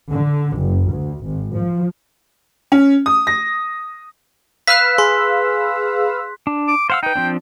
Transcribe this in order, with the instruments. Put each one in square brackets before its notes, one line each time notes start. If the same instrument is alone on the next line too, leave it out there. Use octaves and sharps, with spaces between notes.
[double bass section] D3
F#1
D2
G#1
F3
[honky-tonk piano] C#4
D#6
A#6
[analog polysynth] B4 F5 E6 [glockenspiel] F#6 B6
[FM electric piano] G#4 [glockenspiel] C6
[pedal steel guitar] D4
[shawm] D6
[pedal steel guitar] C5 F#5 E6 [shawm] F5
[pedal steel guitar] D#4 B4 [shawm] G5
[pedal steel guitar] F3 C4 D4